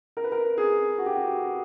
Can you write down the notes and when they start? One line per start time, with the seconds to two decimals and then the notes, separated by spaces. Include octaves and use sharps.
0.17 A#4
0.24 B4
0.32 A#4
0.58 G#4
0.98 F#4
1.06 G4
1.14 F#4